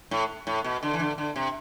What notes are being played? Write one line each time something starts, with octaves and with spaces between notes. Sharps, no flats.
A2
A2
B2
D3
E3
D3
D3
C3